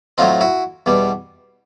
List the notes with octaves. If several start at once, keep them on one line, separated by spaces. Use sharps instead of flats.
A2 F#3 A3 C4 D#4 F4
E4 F#4
E2 B2 G3